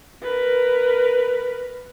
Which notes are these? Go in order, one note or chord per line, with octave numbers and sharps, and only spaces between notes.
A#4 B4